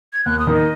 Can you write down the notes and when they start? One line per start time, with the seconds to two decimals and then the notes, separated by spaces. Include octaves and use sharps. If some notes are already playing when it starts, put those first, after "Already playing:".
0.13 G#6
0.25 D#2 F#6
0.39 D#6
0.47 D#3 A#3
0.54 D#5